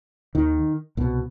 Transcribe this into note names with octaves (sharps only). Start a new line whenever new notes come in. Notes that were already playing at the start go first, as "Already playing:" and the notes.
D#2 D#3
C2 B2